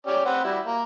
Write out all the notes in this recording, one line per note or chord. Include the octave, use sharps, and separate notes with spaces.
C#4 G4 D5
C4 B4 F#5
G3 E4 F#4
A#3